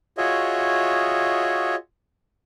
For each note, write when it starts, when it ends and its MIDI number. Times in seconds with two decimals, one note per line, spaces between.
0.18 1.75 65
0.18 1.75 66
0.18 1.75 68
0.18 1.75 73
0.18 1.75 75
0.18 1.75 76